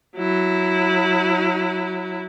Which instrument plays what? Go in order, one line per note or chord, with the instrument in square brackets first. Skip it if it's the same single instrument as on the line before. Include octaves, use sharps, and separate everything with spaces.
[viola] F#3 E4